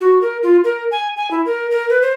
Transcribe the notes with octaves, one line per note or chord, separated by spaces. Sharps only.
F#4
A#4
F4
A#4
G#5
G#5
E4
A#4
A#4
B4
C5